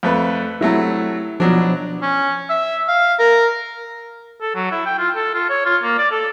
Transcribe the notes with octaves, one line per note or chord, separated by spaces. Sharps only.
F2 A3 B4
C3 F#3 A3 E4
B2 F3 F#3 D4
C#4
E5
F5
A#4
A4
F#3
E4
G5
F4
A4
F4
C#5
F4
A#3
D5
A4